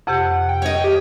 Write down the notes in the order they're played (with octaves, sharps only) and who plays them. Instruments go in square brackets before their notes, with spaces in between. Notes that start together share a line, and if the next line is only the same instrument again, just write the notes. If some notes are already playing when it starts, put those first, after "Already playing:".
[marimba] F2 C3 G4 [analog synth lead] F#5
[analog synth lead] G5
[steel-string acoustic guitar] C#5 D#5
[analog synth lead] G4